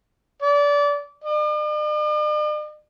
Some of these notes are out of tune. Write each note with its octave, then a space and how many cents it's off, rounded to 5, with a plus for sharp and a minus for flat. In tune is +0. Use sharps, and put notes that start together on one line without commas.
D5 -25
D5 +45